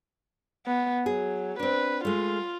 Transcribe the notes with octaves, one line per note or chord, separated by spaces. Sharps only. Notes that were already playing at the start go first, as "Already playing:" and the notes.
B3
F#3 G#4
C4 D4 B4
G#3 A3 F4